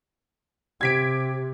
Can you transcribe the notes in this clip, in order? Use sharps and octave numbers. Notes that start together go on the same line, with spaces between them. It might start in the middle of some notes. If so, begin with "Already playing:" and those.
C3 G4 G#6 B6 D7